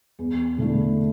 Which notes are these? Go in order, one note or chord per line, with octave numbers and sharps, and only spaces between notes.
E2
D3 A3 E4